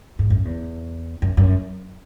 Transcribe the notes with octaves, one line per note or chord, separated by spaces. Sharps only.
G#2
F#2
E2
F#2
F#2